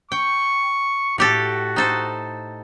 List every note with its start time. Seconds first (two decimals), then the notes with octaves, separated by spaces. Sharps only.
0.12 G5 C#6
1.18 A2 F#4 G4 A4
1.76 D#4 A4 C5